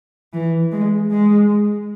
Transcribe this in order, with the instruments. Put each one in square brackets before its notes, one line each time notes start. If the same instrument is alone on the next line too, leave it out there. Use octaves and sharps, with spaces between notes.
[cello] E3
G#3
G#3